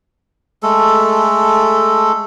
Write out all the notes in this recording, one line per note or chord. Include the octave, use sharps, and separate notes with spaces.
G#3 A3 A4